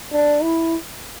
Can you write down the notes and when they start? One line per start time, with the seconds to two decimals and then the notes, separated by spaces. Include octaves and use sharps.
0.12 D4
0.43 E4